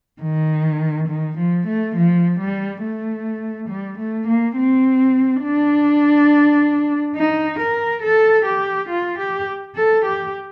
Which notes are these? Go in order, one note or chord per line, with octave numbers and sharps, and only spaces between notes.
D#3
D#3
F3
A3
F3
G3
A3
G3
A3
A#3
C4
D4
D#4
A#4
A4
G4
F4
G4
A4
G4